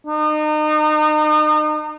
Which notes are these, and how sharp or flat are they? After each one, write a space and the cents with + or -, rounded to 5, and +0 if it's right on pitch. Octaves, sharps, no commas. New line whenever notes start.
D#4 -35